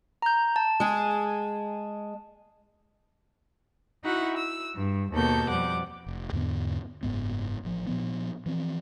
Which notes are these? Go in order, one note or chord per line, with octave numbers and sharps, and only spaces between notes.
A#5 G6
A5
G#3 G#4
D#4 E4 F#4 E5 F#5
E6
G2
D#2 B2 A#3 A4 G6
F2 G3 F#5 D6
F1
E2 G#2 D3 B3
F#1 E2 G#2 B3
A1 F3
A#2 F3 B3
E3 F3 C4